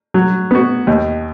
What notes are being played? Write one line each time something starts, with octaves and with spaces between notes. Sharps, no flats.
F#3
B3 F#4
D#2